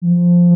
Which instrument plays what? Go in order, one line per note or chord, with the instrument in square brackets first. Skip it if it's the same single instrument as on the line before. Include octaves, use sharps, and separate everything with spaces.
[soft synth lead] F3